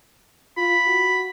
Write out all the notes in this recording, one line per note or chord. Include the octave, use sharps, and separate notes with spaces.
F4 B5
F#4